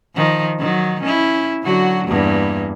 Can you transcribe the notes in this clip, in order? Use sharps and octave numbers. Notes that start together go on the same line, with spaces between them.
D#3 F3
D#3 F#3
C#4 E4
D3 F#3 F#4
E2 G2 A#3